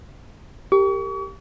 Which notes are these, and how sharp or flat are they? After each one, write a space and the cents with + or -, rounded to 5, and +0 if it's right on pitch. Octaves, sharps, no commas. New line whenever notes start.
G4 +0 A#4 -35 C#6 +40